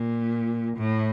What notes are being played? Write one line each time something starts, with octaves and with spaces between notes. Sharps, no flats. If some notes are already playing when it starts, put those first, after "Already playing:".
Already playing: A#2
A2